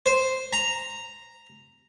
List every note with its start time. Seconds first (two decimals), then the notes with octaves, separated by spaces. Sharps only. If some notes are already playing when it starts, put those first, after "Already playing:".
0.06 C5
0.53 A#5